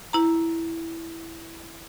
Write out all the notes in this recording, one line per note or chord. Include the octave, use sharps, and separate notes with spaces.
E4 A#5